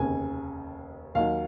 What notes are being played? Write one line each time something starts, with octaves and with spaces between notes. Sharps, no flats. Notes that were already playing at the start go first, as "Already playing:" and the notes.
Already playing: F1 D#2 C#3 G#5
D#2 D#3 F#3 F5